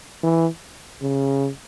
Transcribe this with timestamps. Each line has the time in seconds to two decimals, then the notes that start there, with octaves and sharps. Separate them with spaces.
0.23 E3
1.02 C#3